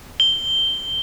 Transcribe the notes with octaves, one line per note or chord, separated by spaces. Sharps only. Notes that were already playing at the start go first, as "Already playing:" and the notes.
G7